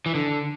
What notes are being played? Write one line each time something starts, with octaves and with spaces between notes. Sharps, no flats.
E3
D3